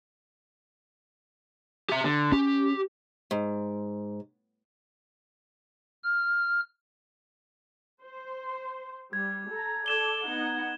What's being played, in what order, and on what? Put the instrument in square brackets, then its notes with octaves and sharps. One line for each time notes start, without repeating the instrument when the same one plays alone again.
[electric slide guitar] G4 E5
D3
[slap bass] C#4 [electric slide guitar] G4
[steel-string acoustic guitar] G#2
[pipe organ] F6
[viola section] C5
[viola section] G3 [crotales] G#6
[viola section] A4 A#5
[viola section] A4 D5 [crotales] G#6 E7 G7
[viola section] B3 D#4 F#5